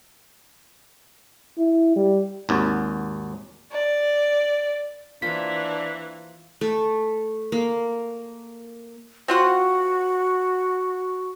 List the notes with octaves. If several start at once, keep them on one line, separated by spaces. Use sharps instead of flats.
E4
G3
G#1 D#2
D5
E3 A#3 D4 F4 C5 B6
A3
A#3
C4 F4 F#4 F#5